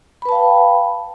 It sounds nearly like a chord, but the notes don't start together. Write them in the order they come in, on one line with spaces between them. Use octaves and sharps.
B5 B4 A5 F5 G5